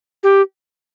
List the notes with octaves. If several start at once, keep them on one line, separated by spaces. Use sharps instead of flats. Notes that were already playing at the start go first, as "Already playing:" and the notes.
G4